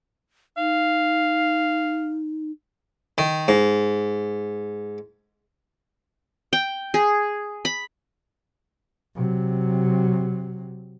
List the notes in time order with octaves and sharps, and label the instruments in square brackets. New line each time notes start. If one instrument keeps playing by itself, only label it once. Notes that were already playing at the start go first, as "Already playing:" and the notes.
[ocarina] D#4 [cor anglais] F5
[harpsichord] D#3
G#2
[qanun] G5
G#4
B5
[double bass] C3 F#3